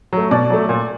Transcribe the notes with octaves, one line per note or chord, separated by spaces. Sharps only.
F#3 A3
B2 D5
F#3 A3
A#2